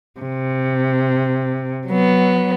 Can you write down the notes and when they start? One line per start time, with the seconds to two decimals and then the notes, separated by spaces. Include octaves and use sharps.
0.21 C3
1.88 F#3 B3